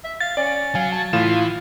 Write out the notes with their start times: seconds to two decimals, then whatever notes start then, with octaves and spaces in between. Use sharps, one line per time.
0.04 E5
0.21 F5 A6
0.37 C#4 D5
0.75 F#3 F5 G#5
0.92 A5
1.13 A2 E3 F4 F5 E7